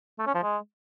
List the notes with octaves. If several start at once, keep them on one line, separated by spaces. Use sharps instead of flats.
A3
C#4
F3
G#3